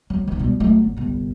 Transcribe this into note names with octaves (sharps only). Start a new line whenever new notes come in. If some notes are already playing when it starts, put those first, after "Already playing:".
F#3
E3 D#4
B2 G3
F#3 A3
G1
G1 C2